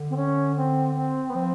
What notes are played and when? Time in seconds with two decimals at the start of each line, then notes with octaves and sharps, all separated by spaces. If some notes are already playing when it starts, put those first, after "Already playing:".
Already playing: D3
0.10 C4
0.16 C#4
0.57 C4
0.95 C4
1.30 B3
1.35 F3 C4